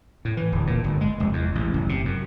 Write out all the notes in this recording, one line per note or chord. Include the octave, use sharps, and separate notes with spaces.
A2
E3
D1
A#2
G1
G#3
F1
E2
A1
F#1
C3
F#2